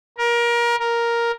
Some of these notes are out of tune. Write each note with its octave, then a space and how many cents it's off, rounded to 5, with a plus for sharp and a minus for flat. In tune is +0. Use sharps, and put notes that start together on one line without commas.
A#4 +25
A#4 +5